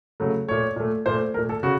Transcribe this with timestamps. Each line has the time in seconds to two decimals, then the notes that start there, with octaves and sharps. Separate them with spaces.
0.20 C#3 F#3 A3
0.48 A#2 A3 C#5
0.76 A#2 A3
1.06 A#2 A3 C5
1.34 A#2 A3 A#4
1.49 A4
1.63 C#3 F#4